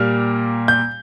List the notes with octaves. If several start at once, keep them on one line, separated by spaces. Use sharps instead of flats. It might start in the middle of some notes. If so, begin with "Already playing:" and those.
Already playing: A#2 G3 A#3 F6
G6